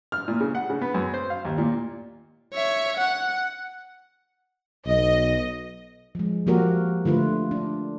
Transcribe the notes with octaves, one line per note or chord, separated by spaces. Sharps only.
F6
A#2
C#3
F#5
C#3
B3
F#2
C5
F5
D#2
A#2
C#5 E5
F#5
B1 D#5
F3 G#3
F3 A#3 F#4 G4 A#4
D3 A3 F4 B4
D4